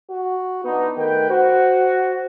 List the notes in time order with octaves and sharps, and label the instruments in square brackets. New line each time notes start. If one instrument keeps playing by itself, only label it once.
[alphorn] F#4
[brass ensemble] E3 D4 D#4 [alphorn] B3
[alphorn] D#3 [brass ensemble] A3 B4 G5
[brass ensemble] F#4 [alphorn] C5